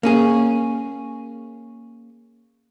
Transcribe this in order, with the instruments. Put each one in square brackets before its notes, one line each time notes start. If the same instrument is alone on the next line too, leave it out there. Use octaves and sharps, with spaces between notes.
[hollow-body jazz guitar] A#3 C#4 G#4